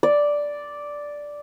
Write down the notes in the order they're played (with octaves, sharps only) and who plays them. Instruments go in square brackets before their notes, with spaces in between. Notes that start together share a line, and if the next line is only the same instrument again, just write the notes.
[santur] D5